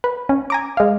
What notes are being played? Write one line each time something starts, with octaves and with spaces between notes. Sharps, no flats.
B4
C#4
G#5 A#5 D6
G#3 F5